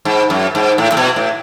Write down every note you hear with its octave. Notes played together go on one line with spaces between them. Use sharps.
G#2
F#2
G#2
A2
A2
B2
A2